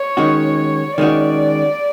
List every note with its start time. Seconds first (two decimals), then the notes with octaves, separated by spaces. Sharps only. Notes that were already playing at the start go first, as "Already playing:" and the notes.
Already playing: C#5
0.17 D#3 G#3 C#4 F#4
0.98 D#3 G#3 C#4 F#4 D5